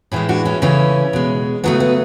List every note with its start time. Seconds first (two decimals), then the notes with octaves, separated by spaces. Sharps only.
0.12 A2 E3 G#3 C#4 E4
0.29 D4 F#4
0.45 C#4 E4
0.62 C#3 E3 A3 C#4 E4
1.13 B2 G#3
1.64 C#3 F#3 A3 B3
1.80 B3